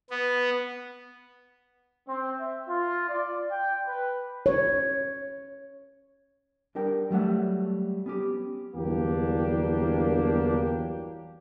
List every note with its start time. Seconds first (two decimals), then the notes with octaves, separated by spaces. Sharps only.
0.10 B3
2.08 C4
2.39 E5
2.69 F4
3.09 D5
3.50 G5
3.87 B4
4.46 C#5
6.75 G3 D4 A#4 G5
7.10 F#3 G3 A3 F#5
8.06 B3 C#4 G4
8.75 G1 E2 F#3 A#3 D4 G4